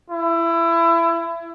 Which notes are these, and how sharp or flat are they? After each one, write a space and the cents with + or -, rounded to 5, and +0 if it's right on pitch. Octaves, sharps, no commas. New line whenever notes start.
E4 +25